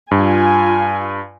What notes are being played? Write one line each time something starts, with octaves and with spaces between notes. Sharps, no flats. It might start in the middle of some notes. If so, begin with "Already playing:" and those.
G2 F4 G#5